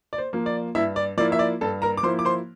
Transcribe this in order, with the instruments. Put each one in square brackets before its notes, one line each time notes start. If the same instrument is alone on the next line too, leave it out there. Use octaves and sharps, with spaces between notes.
[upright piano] D5
C5
F3 A#3
D5
G2 E4 E5
D5
F3 A#3 E4 D5
E5
D5
G2 A4 A5
A#4 A#5
D6
F3 A#3 E4 C5 C6
D6
C5 C6